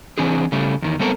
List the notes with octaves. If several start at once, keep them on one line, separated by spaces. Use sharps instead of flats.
E3 C4 D4 G#4
C#3 G3 A3
E2 D#3
G3 B3 C4 A4 A#4